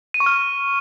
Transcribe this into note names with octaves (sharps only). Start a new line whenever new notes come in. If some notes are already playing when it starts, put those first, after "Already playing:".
D#7
C#6
F6